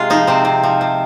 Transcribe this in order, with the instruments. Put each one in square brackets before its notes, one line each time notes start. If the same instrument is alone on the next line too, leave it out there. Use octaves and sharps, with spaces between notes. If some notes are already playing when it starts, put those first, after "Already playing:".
Already playing: [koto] C3 G#3 F4 G#4
F3 D#4
C3 C4
C3
F3
C3